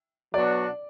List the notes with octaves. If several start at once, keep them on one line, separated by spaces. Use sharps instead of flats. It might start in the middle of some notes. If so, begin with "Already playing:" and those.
B2 F#3 B3 D4 F#4 D5